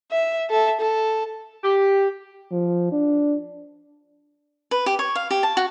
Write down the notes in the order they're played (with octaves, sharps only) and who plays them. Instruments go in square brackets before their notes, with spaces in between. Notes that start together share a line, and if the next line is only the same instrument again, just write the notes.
[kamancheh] E5
A4 E5
A4
[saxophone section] G4
[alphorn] F3
D4
[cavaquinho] B4
G4
C#5
F5
G4
A5
F#4